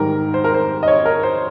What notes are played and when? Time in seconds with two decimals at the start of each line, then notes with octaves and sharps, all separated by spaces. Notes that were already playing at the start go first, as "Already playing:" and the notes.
Already playing: G#2 D#3 G3 A#4
0.34 C5
0.44 A#4
0.54 C5
0.83 D#5
0.88 C#5
1.05 A#4
1.23 C5